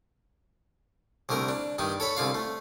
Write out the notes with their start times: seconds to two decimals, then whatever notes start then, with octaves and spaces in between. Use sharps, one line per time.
1.29 C2 D3 A3 A#4
1.49 D4
1.78 G2 D#3 D#4
2.00 A4 C#5 B5
2.17 C2 D3 F4 F5
2.35 A3